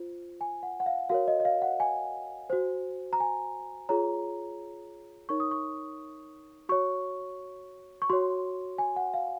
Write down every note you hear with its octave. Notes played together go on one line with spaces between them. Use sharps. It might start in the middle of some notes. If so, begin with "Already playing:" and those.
Already playing: F4 C5
G#5
F#5
F#5
F5
F#4 A#4 C#5 F5
D#5
D#5
F5
F#5
G#5
F#4 C5
A#5
G#5
F4 G#4 C#5 A#5
D#4 A#4 C#5 C#6
D#6
C#6
F#4 C#5 C#6
C#6
F#4 C#5 C6
G#5
F#5
F5